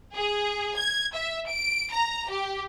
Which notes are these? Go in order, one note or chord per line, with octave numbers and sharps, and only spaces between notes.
G#4
G#6
E5
D7
A#5
G4